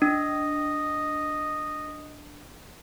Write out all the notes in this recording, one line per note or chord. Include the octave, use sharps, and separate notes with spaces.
D4 D#5